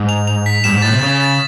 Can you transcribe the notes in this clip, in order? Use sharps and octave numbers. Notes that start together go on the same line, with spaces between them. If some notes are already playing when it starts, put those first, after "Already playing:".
Already playing: G#2
F7
F7
B6
G2 E7
G#2
A2 A6
C3
C#3 A6
A6